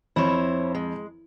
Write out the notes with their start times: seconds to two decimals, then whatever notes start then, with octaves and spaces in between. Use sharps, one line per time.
0.16 F2 E4 C5 C#5
0.75 G#3